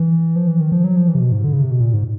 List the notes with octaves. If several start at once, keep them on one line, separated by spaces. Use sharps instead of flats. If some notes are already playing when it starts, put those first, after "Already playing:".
Already playing: E3
F3
E3
D#3
F3
F#3
F3
E3
C3
B2
G#2
D3
C#3
C3
B2
A#2
G#2